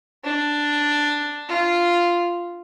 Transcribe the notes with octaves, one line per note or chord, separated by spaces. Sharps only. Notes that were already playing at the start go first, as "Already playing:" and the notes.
D4
F4